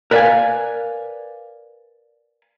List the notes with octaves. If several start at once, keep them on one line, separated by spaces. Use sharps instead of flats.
A#4 B4 D5 E5 F5 G#5